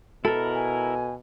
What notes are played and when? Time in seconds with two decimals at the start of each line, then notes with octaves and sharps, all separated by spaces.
0.25 B2 E4 A4 A#4
0.54 G#5